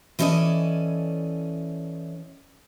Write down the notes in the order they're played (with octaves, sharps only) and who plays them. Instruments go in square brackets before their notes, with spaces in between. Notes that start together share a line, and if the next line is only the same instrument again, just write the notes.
[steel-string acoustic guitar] E3 C#4 A4 D5 D#5